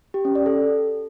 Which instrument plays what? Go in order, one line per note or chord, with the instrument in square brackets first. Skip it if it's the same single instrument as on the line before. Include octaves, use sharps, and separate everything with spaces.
[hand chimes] G4
C#4
D5
A4